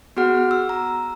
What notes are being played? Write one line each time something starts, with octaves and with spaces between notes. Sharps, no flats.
B3 F#4 G#4 F#5 F6
E6
A#5